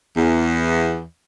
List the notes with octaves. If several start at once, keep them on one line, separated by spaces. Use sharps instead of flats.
E2